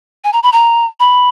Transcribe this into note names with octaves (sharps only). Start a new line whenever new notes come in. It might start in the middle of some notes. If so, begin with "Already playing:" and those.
G#5
A#5
B5
A#5
B5